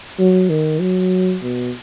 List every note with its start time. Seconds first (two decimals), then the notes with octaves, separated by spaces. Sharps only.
0.19 F#3
0.50 D#3
0.81 F#3
1.43 B2